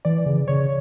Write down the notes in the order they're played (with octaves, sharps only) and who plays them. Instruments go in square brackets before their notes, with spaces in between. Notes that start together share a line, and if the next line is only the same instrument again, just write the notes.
[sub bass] E3 [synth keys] D5
[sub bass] C#3
[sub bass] C#3 [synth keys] C#5